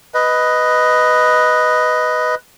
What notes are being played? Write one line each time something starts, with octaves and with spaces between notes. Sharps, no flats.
B4 D#5